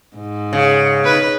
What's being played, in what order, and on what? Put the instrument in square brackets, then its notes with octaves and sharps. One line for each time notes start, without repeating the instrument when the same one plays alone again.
[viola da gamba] G#2
[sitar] C#3
[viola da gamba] D#4 B4